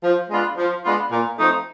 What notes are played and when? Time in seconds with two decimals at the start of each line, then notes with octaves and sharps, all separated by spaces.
0.03 F3
0.30 G#3 B3 D4 F4
0.57 F3
0.84 G#3 B3 D4 F4
1.12 A#2
1.38 F3 A3 C4 D#4